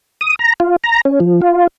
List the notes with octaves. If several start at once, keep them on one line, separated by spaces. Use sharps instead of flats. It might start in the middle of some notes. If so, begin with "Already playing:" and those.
D#6
A#5
F4
A#5
C#4
F3
F4